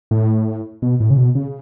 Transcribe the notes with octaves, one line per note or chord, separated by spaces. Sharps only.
A2
B2
A2
C#3
B2
C#3